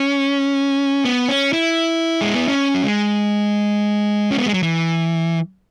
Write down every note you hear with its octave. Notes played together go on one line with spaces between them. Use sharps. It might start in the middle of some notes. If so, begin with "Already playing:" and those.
Already playing: C#4
B3
C#4
E4
G#3
B3
C#4
F#3
G#3
C#4
B3
G#3
F#3
E3